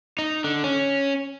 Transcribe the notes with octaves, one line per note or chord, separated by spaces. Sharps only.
D#4
D3
C#4